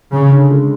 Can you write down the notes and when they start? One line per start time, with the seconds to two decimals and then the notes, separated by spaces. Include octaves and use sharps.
0.13 C#3 C#4
0.31 D3
0.51 G#3